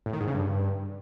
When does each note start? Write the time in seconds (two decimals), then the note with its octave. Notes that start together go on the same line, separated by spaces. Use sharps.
0.06 A2
0.13 D#3
0.20 G#2
0.28 C#3
0.35 G2